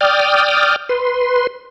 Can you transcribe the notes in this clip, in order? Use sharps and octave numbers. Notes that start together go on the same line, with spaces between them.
D5 G5 D#6 F6
B4 C6